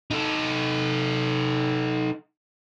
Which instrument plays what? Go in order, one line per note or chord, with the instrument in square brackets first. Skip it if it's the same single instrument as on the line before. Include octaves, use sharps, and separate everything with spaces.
[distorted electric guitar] D#4 A4